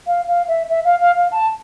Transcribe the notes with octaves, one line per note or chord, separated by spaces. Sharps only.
F5
F5
E5
E5
F5
F5
F5
A5